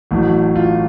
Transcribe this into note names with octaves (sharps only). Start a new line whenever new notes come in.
A1 A2 F#3
F4